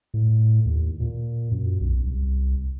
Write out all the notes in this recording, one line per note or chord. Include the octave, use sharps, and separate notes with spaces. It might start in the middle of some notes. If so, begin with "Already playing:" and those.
A2
D#2
A#2
F#2
B1
C2